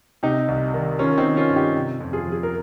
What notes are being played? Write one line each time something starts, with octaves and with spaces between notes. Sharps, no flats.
C3 D#4 G4
C2
D#3
D#3 C#4 F4
C4 D#4
D#3
C#4 F4
G2
D#4 G4
C3
F2
F4 G#4
F3
G#4
A#4